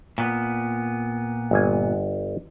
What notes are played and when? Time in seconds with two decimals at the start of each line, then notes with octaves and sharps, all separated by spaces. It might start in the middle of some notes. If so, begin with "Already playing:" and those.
0.18 A#2 B3
1.51 G1 G#5